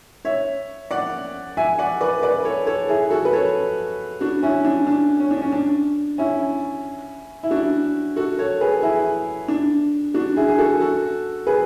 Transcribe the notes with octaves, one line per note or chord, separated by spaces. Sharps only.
C#5 E5
D5 F#5
E5 G#5
D5 F#5
B4 D5
B4 D5
A4 C#5
A4 C#5
E4 G#4
F#4 A4
B4
A4 C#5
D4 F#4
C#4 E4
D4
D4
C#4
D4
C#4
D4
C#4 E4
E4
D4 F#4
F#4 A4
A4 C#5
G#4 B4
E4 G#4
D4
D4 F#4
E4 G#4
G#4
F#4 A4
F#4 A4
G#4 B4